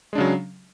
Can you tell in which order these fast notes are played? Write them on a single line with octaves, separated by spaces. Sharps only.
G#3 D4 C#3 F#3